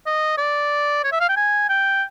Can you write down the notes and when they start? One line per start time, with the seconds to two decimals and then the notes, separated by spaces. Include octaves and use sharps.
0.06 D#5
0.38 D5
1.04 C#5
1.12 E5
1.20 F5
1.29 G5
1.36 G#5
1.69 G5